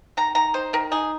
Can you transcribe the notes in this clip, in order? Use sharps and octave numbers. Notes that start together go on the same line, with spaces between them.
D#3 A#5
D#3 A#5
D#4 C5
D#3 A#4
D#4 G#4